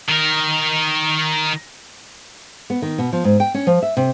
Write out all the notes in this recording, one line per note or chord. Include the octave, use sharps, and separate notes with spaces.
D#3 A#4
B3
D#3
B2
F3
G#2
G5
C#4
F3
E5
C3